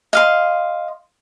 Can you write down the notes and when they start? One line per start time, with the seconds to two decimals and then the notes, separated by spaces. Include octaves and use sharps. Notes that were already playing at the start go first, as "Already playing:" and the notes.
0.13 D#5 F5 C6